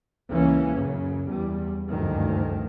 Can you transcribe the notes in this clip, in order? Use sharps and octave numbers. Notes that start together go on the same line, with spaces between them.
C#2 E3 A#3 C#4
F#2 C#3
E2 G3
F#1 D2 G2 D#3 F3